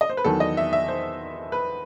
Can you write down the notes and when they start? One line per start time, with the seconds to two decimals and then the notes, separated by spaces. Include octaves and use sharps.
0.01 D#5
0.10 C5
0.17 B4
0.24 E2 D#3 F#3 B3 A4
0.40 D#5
0.57 E5
0.73 E5
0.88 C5
1.52 B4